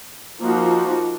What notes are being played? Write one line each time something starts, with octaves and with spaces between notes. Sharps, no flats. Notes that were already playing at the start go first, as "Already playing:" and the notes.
F3 A#3 D#4 F#4